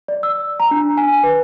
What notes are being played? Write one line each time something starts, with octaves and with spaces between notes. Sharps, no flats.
D5
E6
A#5
D4
G#5
B4